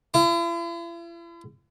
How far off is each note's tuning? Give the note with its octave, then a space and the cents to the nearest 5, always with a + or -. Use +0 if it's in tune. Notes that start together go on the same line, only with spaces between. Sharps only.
E4 +45